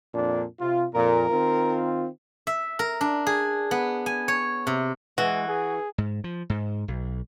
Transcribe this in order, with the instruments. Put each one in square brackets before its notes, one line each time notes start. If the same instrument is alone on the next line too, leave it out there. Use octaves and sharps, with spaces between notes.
[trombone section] F2 A#2 D4
C3 F4
[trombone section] F2 A#2 [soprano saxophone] A#4
[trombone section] D#3 C4 F4
[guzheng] E5
A#4
D4
G#4
B3
G#5
C#5
C3
[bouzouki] E3 [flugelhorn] G#3 [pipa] F#4
[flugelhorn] G#4
[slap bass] G#2
F3
G#2
B1